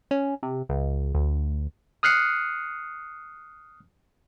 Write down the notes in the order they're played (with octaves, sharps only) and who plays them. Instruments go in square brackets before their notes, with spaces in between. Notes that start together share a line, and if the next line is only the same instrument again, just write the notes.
[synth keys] C#4
C3
C#2
D2
[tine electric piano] D#6 F6 F#6 C7 C#7